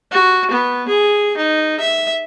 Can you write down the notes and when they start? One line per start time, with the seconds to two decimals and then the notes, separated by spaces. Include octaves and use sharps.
0.11 F#4
0.51 B3
0.88 G#4
1.37 D#4
1.80 E5